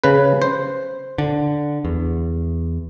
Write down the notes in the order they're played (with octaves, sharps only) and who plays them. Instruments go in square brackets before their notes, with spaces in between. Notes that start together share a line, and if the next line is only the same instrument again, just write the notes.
[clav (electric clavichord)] C#3 B4
C5
[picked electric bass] D3
E2